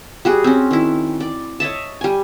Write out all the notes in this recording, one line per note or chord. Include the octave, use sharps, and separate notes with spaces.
G3 F#4 G#4
C4 C#4
D#3 E4
D5
C#5 D#5 E5 A5
G3 G#5